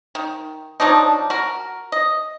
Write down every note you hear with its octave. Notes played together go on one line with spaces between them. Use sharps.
D#3
F3 F#3 D4 D#4
F#4 A#4
D#5